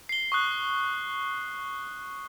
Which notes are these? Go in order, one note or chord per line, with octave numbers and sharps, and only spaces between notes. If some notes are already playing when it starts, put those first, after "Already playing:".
C7 G7
C#6 D#6 F#6